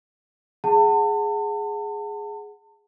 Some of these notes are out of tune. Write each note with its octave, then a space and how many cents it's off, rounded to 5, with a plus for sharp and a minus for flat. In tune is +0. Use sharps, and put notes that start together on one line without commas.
G#4 +0 F#5 +0 A5 +35